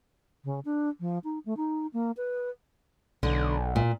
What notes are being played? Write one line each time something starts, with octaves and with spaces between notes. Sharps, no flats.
C#3
D4
F3
D#4
A3
D#4
A#3
B4
B1 D3
A#2